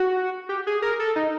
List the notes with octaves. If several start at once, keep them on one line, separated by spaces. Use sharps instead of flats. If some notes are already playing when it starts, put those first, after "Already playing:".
Already playing: F#4
G4
G#4
A#4
A4
D#4